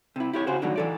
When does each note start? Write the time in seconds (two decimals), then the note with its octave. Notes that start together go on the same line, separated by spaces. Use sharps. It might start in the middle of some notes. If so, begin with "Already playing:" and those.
0.16 C3 E4
0.33 E4 G4 C#5
0.47 C#3 F#4 C5
0.62 C2 A2 D3 D#3 F#3 F#4
0.76 E3 A4 D5